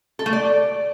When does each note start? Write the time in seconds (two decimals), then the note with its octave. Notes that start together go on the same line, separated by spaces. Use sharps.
0.19 A4
0.26 A3
0.33 D5